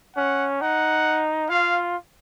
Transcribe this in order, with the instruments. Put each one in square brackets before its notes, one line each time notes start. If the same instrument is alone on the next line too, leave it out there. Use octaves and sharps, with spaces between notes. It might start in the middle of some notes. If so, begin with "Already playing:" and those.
[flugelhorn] C#4 [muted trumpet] F#5
[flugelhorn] D#4 [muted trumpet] F#5
[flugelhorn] F4 [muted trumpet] F5